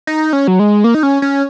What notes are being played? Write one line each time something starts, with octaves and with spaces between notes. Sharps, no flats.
D#4
C#4
F#3
G#3
A#3
D#4
C#4
C#4